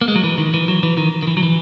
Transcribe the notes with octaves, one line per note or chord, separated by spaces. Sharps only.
A#3
G#3
F#3
E3
D#3
E3
F#3
E3
D#3
D#3
E3
F#3
E3